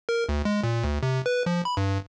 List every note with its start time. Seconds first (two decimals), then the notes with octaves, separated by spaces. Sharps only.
0.09 A#4
0.29 D2
0.45 G#3
0.64 A#2
0.84 D2
1.03 C3
1.26 B4
1.46 F3
1.65 B5
1.77 G2